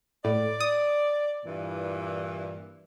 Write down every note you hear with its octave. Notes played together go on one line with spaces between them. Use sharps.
A2 D5
D#6
G2 A#2 E3